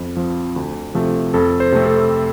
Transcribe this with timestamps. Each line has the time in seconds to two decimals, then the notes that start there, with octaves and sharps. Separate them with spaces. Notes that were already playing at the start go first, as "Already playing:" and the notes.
Already playing: F2
0.17 F3 C4
0.56 D2
0.95 C3 F3 A3
1.34 F2 A4
1.60 C5
1.72 C3 A3 C4
1.86 A4